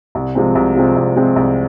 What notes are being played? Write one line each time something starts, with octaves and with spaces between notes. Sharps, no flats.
C2
C3 F3 G#3 C4
C2
C3 F3 G#3 C4
C2
C3 F3 G#3 C4
C2